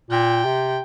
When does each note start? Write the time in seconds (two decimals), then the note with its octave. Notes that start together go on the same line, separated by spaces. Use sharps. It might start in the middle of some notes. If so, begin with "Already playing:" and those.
0.10 A#2 G5
0.45 C3